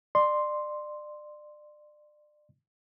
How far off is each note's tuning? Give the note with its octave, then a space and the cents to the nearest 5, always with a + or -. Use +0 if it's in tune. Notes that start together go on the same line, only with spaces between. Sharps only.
D5 +30 C6 +0